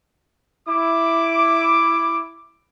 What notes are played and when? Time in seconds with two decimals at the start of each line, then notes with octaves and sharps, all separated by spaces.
0.68 E4 D6